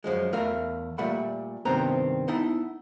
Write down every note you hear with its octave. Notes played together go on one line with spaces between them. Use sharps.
F#2 F3 G#3
E2 A3 A#4 E5 F5
A#2 G3 A3 E5 F#5 B5
G2 C3 D#3 B3 C4 A#5
B3 D#4 E4